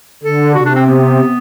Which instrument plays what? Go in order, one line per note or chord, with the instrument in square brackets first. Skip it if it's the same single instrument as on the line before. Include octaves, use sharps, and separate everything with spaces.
[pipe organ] D3 [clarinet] A4
[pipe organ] C3 [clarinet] F#4
[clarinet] D4
C4
B3